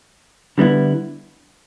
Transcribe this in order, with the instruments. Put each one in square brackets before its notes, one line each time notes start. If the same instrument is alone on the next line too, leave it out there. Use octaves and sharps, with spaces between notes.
[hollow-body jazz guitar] D3 G3 B3 E4